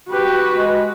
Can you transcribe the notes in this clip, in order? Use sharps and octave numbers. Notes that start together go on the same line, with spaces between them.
F#4 G4 B4
G#3